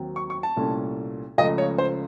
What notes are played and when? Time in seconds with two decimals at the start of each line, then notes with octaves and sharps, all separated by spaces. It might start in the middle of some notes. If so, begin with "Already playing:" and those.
Already playing: D#2 D#3 F#3 C4
0.16 C#6
0.30 C#6
0.43 A5
0.56 C2 A#2 A3 C#4
1.38 C#2 C#3 F3 A3 D#5
1.58 C#5
1.78 C5